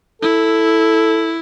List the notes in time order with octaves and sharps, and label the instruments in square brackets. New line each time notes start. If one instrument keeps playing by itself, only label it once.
[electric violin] E4 [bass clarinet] A4